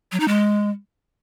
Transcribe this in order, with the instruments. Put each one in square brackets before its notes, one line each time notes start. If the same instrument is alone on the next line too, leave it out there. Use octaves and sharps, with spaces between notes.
[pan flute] F#3
D#4
G#3